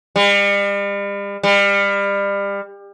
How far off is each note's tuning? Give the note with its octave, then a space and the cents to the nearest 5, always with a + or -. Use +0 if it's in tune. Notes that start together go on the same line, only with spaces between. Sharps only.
G3 +40
G3 +30